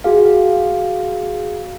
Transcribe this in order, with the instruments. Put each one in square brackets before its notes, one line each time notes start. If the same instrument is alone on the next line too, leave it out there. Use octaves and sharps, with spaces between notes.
[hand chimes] F#4 G#4 F5